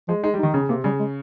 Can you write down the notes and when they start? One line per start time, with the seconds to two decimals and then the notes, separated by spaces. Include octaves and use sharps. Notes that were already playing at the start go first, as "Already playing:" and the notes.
0.08 F3 G#3
0.23 G#3 D#4
0.34 G3
0.39 D#4
0.43 D#3
0.54 C#3 C#4
0.69 C3 A#3
0.84 C#3 G3
0.99 G#3